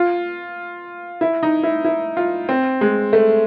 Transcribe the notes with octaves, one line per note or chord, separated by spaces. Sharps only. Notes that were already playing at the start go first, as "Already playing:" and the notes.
Already playing: F4
E4
D#4
E4
E4
F4
C4
G#3
A3